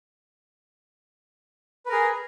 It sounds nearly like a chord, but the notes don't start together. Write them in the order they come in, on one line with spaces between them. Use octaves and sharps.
B4 A#4 G#4